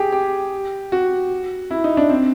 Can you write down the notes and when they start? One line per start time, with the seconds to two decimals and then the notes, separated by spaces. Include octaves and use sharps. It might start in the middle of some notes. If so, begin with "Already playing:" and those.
Already playing: G4 G#4
0.12 G4
0.92 F#4
1.71 E4
1.84 D#4
1.97 D4
2.10 C4